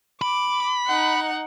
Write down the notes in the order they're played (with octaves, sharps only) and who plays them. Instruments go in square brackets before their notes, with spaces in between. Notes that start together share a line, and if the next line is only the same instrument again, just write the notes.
[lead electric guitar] B5 [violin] D6
[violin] D#4 F#5